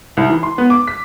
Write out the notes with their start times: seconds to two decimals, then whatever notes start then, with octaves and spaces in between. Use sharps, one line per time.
0.17 C2
0.29 E3
0.43 C6
0.58 B3
0.70 D6
0.87 B6